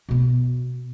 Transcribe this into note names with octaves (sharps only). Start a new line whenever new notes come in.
B2 B3